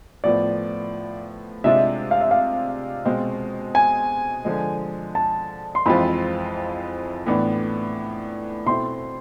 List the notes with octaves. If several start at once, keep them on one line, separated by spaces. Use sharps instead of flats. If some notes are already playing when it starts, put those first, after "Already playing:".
A2 F3 B3 F4 D5
C3 G#3 D4 F4 E5
F5
E5
F5
B2 G#3 C4
G#5
D3 F3 G#3
A5
C6
F2 E3 G#3 C4 F4 B5
A2 E3 B3 D4
B2 A3 C4 E4 C6